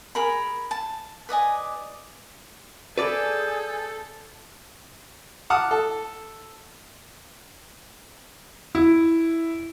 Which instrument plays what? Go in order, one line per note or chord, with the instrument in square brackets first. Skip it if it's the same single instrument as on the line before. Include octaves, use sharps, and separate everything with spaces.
[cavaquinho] G#4 A#4 B5
A5
B4 D5 D#5 G#5
[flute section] G#4 G#5 G6 [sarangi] A4 [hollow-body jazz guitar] B4 D5
[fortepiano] F#5 A5 D6 D#6 F6
A4
[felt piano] E4